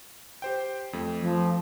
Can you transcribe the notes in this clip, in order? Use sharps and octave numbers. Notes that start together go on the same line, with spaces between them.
G4 C5 G5
F2 A3
F3